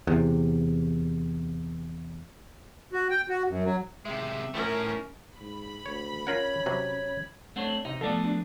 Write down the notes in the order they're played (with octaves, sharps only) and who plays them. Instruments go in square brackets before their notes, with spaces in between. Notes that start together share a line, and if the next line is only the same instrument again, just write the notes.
[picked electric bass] E2 C3
[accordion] F#4
G5
F#4
F#2
F#3
[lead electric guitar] C3 G#3 [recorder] E5
[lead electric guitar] A3 E4 [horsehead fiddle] C#4 A#4
[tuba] G#2 [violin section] B5
[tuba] D2 [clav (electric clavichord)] C#5
[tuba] C#4 [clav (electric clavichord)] F4 A#4 F#5 [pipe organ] C#5
[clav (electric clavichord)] C3 F#3
[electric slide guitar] A3 C4 D4 [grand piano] C#5 F#5
[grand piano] C3 [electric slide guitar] D#4
[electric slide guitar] F3 A3 B3 [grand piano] A4 D5
[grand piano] D4